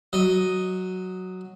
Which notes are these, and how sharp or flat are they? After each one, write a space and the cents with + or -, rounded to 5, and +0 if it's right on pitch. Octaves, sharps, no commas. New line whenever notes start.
F#3 +0 D#5 +0